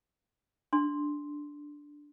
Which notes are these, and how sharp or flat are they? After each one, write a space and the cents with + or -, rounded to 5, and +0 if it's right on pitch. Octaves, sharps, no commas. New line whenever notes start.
D4 +0 C6 +0